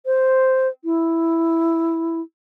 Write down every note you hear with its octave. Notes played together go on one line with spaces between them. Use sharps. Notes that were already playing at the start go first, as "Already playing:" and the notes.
C5
E4